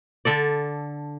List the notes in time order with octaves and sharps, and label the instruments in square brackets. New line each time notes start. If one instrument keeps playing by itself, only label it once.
[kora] D3 A4 D5